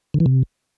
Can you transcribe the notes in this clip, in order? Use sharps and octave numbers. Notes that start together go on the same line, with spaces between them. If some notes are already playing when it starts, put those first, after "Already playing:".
D3
E3
C3